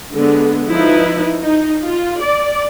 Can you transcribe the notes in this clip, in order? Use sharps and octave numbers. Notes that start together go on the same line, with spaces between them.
D3 G#3 B3
F3 D#4 E4 B4
D#4
F4
D5